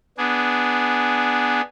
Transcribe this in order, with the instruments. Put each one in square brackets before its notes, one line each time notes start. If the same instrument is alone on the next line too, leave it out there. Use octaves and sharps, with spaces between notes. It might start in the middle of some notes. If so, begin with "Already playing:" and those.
[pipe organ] B3 D4 G#4